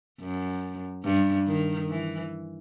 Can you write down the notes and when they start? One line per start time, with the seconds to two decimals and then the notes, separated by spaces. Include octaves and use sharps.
0.20 F#2
1.04 G2
1.47 D#3
1.89 E3